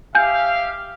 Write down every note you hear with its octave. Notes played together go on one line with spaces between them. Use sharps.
G4 E5 F5 G#5 G6